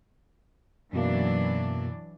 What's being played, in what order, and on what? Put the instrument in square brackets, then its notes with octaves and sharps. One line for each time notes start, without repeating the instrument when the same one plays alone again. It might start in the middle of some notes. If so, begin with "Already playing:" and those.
[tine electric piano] F#2 B2 A#3 [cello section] E3 F#3 D4